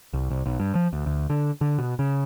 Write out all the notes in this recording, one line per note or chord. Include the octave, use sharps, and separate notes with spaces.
C2
C2
B1
G2
F3
D2
D2
D3
D3
B2
C#3